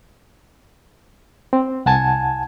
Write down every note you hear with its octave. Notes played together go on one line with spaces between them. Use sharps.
C4
C2 F#5 G#5 A5 G#6